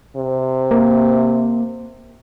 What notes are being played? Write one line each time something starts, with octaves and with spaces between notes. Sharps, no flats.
C3
A#3